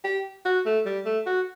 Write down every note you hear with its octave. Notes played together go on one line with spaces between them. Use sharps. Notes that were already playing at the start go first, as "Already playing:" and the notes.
G4
F#4
A3
G3
A3
F#4